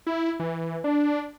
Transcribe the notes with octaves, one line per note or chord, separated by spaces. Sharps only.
E4
E3
D4